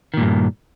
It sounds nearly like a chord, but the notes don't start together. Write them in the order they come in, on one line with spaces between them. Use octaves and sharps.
D#3 A#2 G2